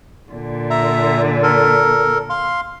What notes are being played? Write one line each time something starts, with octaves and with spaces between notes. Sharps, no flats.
A#2 D3
E5 A#5
A4 A#4
F5 C6